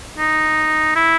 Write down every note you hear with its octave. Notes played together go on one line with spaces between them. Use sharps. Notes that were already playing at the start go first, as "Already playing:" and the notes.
D#4
E4